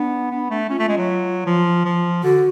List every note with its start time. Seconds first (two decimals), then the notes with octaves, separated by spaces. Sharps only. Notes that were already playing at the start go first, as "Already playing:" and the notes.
Already playing: B3 D4
0.31 B3
0.51 A3
0.70 C#4 F4
0.79 A3
0.89 G#3
0.98 F#3
1.46 F3
1.85 F3
2.24 D3 F#4